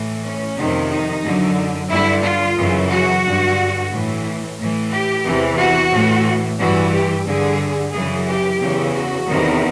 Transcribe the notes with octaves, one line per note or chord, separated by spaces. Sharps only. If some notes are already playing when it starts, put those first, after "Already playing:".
Already playing: A2 E3
C#4
F2 C3 D#3
D#4
F#2 D3
G2 D3 E4
F4
F#2 C#3 E3
F#4
G2 D3
A2 E3
A2 E3
G4
E2 C3 E3
F#4
A2 E3
G2 E3 F#4
G4
G2 D3 G#4
F#2 C#3 E3 G#4
G4
E2 C#3 E3
F#4
E2 C3 D#3